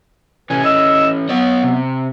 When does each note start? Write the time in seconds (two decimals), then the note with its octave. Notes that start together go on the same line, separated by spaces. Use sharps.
0.50 C3 E3 C#4 B4 G#5
0.64 D#5 E6
1.29 F#3 B3 C#5 D#5
1.63 C3